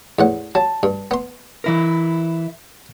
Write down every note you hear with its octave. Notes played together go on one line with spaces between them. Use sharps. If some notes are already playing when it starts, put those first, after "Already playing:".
E2 A2 F#5
F#3 A5
G2
B3 C6
E3 E4 A#4